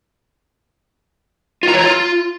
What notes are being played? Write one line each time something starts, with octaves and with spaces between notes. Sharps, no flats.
F4
A#5
C#5
A#5
F4